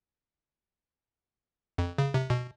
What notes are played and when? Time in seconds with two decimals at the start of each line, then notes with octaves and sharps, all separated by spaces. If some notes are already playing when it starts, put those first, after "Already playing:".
1.78 F2
1.98 C#3
2.14 C3
2.30 B2